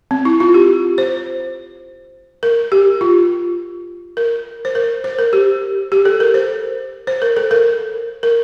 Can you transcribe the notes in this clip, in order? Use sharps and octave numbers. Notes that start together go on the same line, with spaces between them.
C4
E4
F4
G4
C5
A#4
G4
F4
A#4
C5
A#4
C5
A#4
G4
G4
A4
A#4
C5
C5
A#4
A4
A#4
A#4